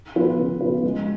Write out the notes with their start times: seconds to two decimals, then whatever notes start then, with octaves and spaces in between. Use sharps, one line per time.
0.16 F3 B3 F4 B4
0.39 C#3
0.61 F3 B3 F4 B4
0.83 G#3